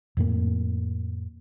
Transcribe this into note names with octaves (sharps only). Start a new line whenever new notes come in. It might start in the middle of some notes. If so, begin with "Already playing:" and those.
F2 A2 A#3